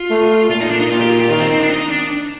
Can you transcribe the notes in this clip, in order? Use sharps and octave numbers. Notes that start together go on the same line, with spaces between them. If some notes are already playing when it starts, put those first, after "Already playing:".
Already playing: F4
A3
A#2 F4
D#4
D4
D#4
A#2 F4
G4
F4
G4
D#3 F4
C4
C4
D4
D#4
D4